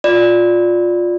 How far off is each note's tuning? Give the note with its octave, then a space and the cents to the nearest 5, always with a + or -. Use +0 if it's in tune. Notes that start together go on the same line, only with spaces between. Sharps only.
F4 +15 D5 +0 B5 +5